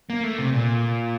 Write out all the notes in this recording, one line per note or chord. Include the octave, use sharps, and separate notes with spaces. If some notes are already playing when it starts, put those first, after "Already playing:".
A#3
A3
C3
A#2